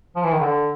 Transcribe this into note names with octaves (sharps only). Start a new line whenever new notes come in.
F3
E3
D#3
D3